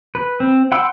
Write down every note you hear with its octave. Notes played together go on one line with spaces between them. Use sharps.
B4
C4
F#5 G5 B5 C6 E6